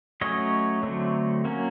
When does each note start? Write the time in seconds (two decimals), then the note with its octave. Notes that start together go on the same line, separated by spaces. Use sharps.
0.21 F#3 A3 C#4 C#5 D#5
0.83 D3 F#3 A3 C4
1.45 F#3 A#3 C#4